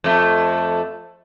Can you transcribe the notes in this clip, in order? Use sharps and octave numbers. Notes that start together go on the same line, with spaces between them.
F2 A3